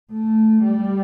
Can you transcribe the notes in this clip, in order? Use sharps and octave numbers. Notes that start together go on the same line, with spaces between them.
A3
G3